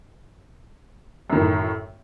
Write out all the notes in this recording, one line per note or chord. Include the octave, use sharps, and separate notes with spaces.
F#2 A2 D#3